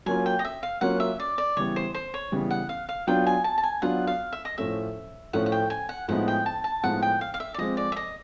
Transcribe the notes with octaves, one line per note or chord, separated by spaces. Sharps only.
F#3 A#3 C#4 F4 G#5
G5
D#5
E5
F5
F#3 A#3 C#4 F4 F#5
E5
D5
D5
C#3 E3 G3 B3 C#5
C5
C5
C#5
C#3 E3 G3 B3
F#5
F5
F5
F#3 B3 D4 F4 G5
G#5
A5
A5
G#5
F#3 B3 D4 F4 F#5
F5
E5
D#5
A2 F3 A3 C#4 E5
A2 F3 A3 C#4 F#5
F#5
G5
G#5
F#5
A2 F3 G#3 B3 D#4 F#5
G5
A5
A5
A2 F3 G#3 B3 D#4 F#5
G5
F5
F5
E5
D5
F3 G#3 C4 D#5
D5
E5
D#5